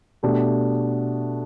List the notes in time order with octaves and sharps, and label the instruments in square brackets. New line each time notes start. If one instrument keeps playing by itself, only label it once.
[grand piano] B2 A3 D4 G4